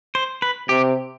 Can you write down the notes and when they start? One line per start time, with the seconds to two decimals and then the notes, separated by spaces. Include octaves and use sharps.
0.15 C5
0.42 B4
0.69 C3 G4